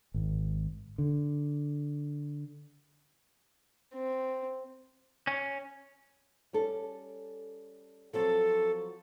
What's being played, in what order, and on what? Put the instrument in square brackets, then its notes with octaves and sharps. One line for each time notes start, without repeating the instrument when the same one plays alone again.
[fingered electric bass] G#1
D3
[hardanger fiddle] C4
[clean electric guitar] C#4
[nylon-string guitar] G3 C#4 A4
[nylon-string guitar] F3 F#3 C4 [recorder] A4